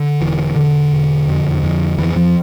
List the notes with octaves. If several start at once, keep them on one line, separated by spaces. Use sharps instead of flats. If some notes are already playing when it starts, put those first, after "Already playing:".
Already playing: D3
E1 E3
E1 D3
E1
F2
F2
F2 E3
F2 F3